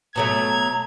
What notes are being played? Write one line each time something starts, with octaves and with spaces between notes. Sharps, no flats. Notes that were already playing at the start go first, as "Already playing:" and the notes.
B2 F#3 A3 A#5 G#6